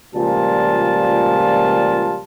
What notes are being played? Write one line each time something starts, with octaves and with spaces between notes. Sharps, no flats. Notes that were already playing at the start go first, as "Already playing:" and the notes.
C#2 A#2 F3 G3 F4 A5